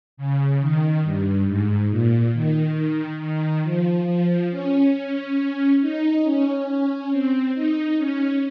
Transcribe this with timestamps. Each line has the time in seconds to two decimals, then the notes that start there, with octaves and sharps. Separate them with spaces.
0.17 C#3
0.60 D#3
1.04 G2
1.48 G#2
1.91 A#2
2.34 D#3
3.20 D#3
3.63 F3
4.07 F3
4.51 C#4
4.94 C#4
5.81 D#4
6.24 C#4
6.68 C#4
7.11 C4
7.55 D#4
7.98 C#4